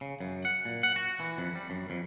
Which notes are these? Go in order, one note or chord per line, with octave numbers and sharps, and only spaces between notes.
C#3
F#2
F#5
A#2
F#5
F#4
E3
F2
G3
F#2
F2